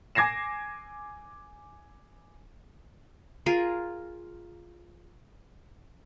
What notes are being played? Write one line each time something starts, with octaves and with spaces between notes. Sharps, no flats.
G#5 D6 G#6 A#6 C7 E7
F4 G#4 A#4